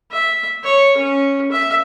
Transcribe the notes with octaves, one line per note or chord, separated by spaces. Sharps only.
E5
C#5
C#4
E5